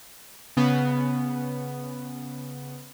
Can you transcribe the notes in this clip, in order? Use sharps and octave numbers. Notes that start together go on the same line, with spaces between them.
C#3 B3